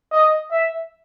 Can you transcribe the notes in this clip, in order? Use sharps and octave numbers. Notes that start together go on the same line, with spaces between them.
D#5
E5